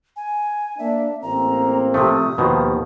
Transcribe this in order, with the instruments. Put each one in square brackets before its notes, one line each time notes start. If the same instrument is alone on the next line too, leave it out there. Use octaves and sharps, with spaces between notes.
[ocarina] G#5
[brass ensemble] A#3 D4 [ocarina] E5
[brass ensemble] A1 A#3 C4 [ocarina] A#5
[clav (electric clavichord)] C3 F3 A3 [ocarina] D#6
[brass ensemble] D#2 [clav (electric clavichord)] B2 D#3 F3